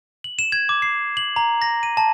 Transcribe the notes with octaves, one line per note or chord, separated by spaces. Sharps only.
F#7
E7
G#6
D6
C7
F#7
A#5
A#6
D#7
A5